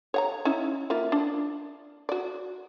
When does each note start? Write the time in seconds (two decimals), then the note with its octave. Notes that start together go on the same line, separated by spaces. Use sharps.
0.14 C#5 F#5 A#5
0.45 C#4 D#4 E4
0.90 A#3 E4 F4
1.12 D4
2.09 F#4 D5